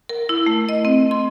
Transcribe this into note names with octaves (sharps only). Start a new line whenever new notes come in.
A#4
E4
A3
D#5
C4
C6